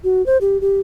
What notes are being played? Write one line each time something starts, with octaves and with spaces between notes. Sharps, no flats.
F#4
C5
G4
G4